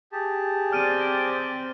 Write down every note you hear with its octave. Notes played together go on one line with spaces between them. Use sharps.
G4 G#4 A5
C4 D5 F6 D7 D#7